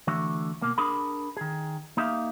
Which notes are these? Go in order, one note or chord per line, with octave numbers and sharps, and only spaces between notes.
D3 E3 A3 F#4
B2 A#3
D4 G#4 A#4 B5
D#3 G#4
A#3 D#4 G4 E5 F5